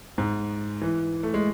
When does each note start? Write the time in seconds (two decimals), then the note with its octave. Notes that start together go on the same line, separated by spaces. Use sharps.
0.18 G#2
0.82 E3
1.23 A3
1.34 G#3